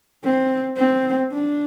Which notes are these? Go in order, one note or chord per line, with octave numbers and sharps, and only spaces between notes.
C4
C4
D4